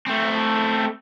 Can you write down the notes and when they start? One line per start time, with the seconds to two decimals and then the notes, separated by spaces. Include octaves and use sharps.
0.07 A3 C4